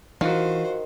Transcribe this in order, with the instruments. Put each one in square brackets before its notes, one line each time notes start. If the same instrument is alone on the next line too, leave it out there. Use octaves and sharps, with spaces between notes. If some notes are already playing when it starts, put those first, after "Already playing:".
[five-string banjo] D#3 [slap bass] E3 [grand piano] F4 F#4 [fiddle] C5